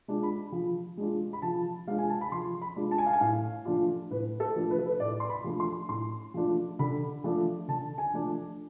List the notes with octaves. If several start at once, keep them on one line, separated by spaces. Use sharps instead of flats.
G#3 D4 F4
B5
F3
G#3 D4 F4
B5
F3 A5
G#3 D4 F4 F5
G#5
A5
B5
F3 C6
B5
G#3 D4 F4
A5
G#5
F5
G#5
A2 F5
F3 A3 D4 F4
A2 B4
A4
F3 A3 D4 F4
B4
A4
B4
A2 D5
C6
B5
F3 A3 D4 F4
C6
A2 C6
F3 A3 D4 F4
D3 B5
F3 A3 D4
D3 A5
G#5
F3 A3 D4